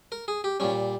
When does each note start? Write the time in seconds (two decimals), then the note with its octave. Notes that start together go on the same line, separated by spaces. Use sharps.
0.12 A#4
0.28 G#4
0.44 G4
0.60 A#2 G3 C#4